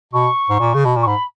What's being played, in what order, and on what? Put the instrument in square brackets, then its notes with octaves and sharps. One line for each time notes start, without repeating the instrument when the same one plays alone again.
[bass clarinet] B2 [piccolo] C#6
[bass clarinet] G#2
A#2
C#3
B2
A#2
[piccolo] C#6
[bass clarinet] G#2 [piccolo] B5